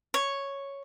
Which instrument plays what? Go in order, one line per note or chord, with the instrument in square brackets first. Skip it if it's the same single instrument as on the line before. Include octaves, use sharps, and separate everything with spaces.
[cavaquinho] C#5